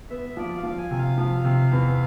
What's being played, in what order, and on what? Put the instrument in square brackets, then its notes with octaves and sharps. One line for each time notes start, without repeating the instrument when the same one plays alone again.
[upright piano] B3 [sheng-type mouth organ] E5
[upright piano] F3 [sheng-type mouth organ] D5
[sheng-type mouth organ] F5
[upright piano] F3
[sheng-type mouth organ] F5
G#5
[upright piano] C3
[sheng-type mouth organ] F5
[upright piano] F3
C3
E2